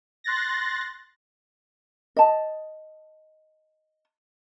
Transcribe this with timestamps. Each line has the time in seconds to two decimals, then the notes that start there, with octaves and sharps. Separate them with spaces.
0.24 C6 F#6 A6 A#6
2.16 D#5 A5